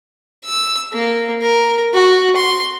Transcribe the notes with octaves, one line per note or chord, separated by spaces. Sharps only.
E6
A#3
A#4
F#4
C6